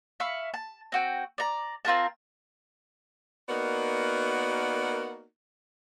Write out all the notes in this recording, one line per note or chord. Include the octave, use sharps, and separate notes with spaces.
E5 F5 B5 C#6
A5
C4 F#4 G5
D5 A#5
C4 F4 A#4 A5
A#3 B3 D#4 F#4 A#4 D5